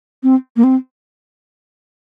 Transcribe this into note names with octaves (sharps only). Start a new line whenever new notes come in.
C4
A#3
C4